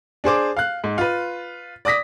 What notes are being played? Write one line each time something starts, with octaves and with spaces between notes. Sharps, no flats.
D4 G#4 C5 D6
F5 F#6
G#2
F4 B4
D5 D6 D#6 A#6 B6